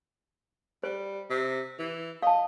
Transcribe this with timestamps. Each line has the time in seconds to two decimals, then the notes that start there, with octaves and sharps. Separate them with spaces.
0.84 G3 C5
1.30 C3
1.78 E3
2.23 D#5 F5 A5